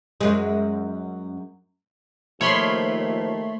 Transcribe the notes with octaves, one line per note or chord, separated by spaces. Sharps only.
F#2 G#3
D#2 F3 A3 C#5 B5 C6